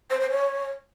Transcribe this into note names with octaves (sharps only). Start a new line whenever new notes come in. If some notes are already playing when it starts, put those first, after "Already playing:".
C5
C5
C#5